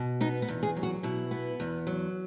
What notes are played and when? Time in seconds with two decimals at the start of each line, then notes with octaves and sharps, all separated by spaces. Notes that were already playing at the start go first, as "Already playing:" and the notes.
Already playing: B2
0.21 B3 D#4
0.42 B3
0.48 E2
0.63 G#4
0.77 F#3
0.83 F#4
1.03 B2 E4
1.31 B3
1.60 E2
1.87 F#3